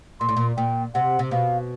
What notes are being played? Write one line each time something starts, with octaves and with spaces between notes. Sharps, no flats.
A#2 C6
A2
A#2
A#2 G5
C3 F#5
C3
B2 F5